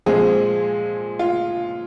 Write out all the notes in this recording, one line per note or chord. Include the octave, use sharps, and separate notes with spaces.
A#2 F3 G#3 C4 G#4
F4